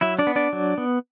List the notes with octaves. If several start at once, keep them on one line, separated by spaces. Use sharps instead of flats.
F#3 E4 E5
D4 D5
B3
D4 D5
F#3
B3